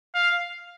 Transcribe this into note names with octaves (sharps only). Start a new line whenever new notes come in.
F5